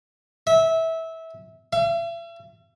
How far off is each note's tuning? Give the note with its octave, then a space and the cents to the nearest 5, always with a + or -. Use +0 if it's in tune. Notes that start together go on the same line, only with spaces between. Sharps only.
E5 -20
E5 +40